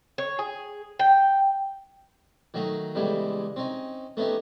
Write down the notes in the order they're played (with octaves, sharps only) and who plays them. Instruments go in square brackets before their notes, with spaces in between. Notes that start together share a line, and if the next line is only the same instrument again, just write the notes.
[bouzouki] C#5
G#4
G5
[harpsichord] D#3 F#3 A3 D#4
E2 A2 C#3 G3 G#3
C4 C#4 D#4
A3 B3 C#4 D#4 G4